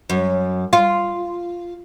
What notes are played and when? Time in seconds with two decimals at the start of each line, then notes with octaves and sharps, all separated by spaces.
0.10 F#2
0.73 F4